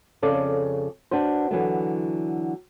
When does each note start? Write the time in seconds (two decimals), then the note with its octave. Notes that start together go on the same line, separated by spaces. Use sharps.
0.22 F2 C#3 A4 D5
1.11 D4 F#4 B4 C5
1.51 D3 E3 F#3 A3